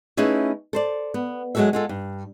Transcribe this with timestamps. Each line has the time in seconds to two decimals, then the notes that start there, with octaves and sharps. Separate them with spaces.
0.17 A3 C#4 D#4 E4 G#4 B4
0.73 A4 C5 D5
1.14 B3
1.55 F#3 G#3 A#3 F#4 A4 E5
1.73 G#3 F4 A4
1.89 G2